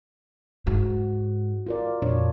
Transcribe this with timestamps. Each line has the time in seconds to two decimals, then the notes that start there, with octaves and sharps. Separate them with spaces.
0.67 G#2 F#4
1.66 F4 A#4 D5
2.02 F2 A#2 D4 C#5